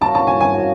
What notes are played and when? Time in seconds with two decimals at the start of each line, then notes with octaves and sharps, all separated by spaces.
0.01 A#3 C#4 F#4 A5
0.15 A5
0.27 G#5
0.41 G#5
0.53 A#3 C#4 F#4